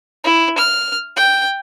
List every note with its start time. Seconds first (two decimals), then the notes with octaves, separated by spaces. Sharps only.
0.24 E4
0.58 F6
1.16 G5